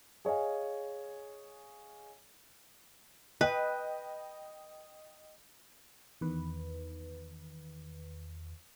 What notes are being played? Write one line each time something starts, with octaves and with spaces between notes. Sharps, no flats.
G#4 C#5 D#5 F5 G#5
B4 D#5 G5
E2 D#3 B4